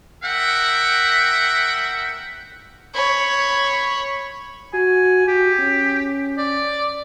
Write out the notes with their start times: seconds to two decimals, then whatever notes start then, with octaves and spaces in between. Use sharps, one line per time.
0.23 A#4 E5 F#5 G5
2.95 C#5 B5
4.74 F#4 G#5
5.28 F#4 G4
5.60 C#4
6.38 D5